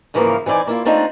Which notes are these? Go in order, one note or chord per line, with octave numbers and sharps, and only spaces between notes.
G#2 C#3 E3 F3 A3 A#3
E3 C4 D#4 D5 G#5
A#3 E4 F4
A3 C4 D4 D#4 F4